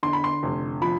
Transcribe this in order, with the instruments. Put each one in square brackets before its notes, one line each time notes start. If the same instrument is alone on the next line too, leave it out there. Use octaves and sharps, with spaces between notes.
[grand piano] D3 [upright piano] C6
[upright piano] B5
C6
[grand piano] F1
[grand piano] F3 [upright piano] B5